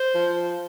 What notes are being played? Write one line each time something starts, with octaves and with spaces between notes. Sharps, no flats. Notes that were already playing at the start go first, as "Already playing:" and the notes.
Already playing: C5
F3